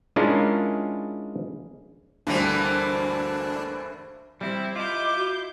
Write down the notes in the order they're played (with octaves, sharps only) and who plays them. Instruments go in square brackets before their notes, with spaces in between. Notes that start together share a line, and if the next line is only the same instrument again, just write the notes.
[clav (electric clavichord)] G#3 C#4 D4 E4 F4 A#4
[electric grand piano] D2 G2 D3 [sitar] E3 A#3 C4 [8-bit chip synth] D4
[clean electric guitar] G3 C4 [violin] E4
[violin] E4 G6 [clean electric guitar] F4 [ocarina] D#5 [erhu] D6
[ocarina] F#4